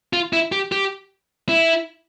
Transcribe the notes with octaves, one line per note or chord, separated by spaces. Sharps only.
F4
E4
G4
G4
E4